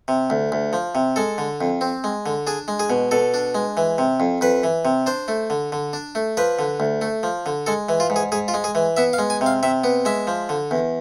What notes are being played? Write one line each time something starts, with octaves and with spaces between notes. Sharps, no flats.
C3
D2
D2
F3
C3
G#3 A4
D3
F2
C4
G#3
D3
D4 G#4
G#3
G#4
B2
B2 A4
D4
G#3
E3
C3
F2
F2 B4
E3
C3
D4 C5
A3
D3
D3
D4
A3
F3 B4
D3
D2
A3
F3
D3
G#3 A4
E3
F4
G#2
G#4
G#2 G#4
F4
G#3
G#4
E3
B3 E5
F5
G#3
G#5
C3
F5
C3 E5
B3
G#3 E5
F3
D3
E2